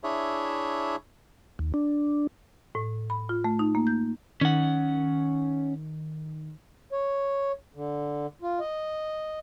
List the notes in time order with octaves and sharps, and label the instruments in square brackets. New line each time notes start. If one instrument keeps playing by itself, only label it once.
[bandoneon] D4 E4 G#4 C#5 E5
[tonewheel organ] D#2
D4
[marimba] A2
B5
F4
A3
D#4
A#3
G6
[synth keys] D#3 [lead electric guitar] C#4 F#5
[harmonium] C#5
D3
F4
D#5